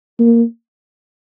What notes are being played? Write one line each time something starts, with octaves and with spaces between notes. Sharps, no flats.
A#3